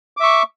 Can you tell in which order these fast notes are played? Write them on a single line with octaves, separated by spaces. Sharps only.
D6 E5 C#6